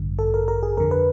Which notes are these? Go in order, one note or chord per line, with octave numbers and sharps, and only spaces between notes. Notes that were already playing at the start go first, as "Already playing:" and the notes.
Already playing: A1 G2 D3
A4
A#4
A#4
G#4
F2 D3 A#4
B4